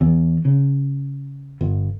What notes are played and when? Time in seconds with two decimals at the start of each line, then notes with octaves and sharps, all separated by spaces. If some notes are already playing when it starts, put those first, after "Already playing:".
0.01 E2
0.45 C#3
1.61 G1